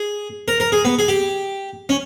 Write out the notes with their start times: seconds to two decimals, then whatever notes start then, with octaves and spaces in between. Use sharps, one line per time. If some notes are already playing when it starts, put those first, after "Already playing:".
Already playing: G#4
0.48 A#4
0.60 A#4
0.72 G#4
0.85 B3
0.99 G#4
1.08 G4
1.89 C#4